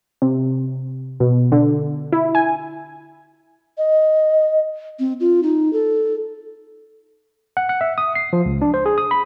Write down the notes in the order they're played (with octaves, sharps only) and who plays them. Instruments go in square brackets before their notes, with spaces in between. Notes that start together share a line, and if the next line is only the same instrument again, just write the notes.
[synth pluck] C3
B2
D3
E4
G#5
[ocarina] D#5
C4
F4
D#4
A4
[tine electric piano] F#5
F#5
E5
D#6
C7
F3
C#2
D4
C5
G#4
D#6
B5